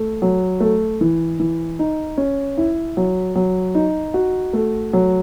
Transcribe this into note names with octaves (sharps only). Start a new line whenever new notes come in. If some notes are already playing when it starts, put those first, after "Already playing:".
Already playing: A3
F#3
A3
E3
E3
D#4
C#4
E4
F#3
F#3
D#4
F#4
A3
F#3